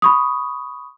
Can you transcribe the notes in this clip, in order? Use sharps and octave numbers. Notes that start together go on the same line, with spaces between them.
B5 C#6 D#6